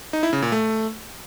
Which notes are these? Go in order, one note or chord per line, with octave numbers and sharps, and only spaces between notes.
D#4
E4
C#3
A#2
A3